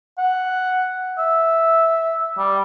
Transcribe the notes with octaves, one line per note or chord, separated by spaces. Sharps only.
F#5
E5
G3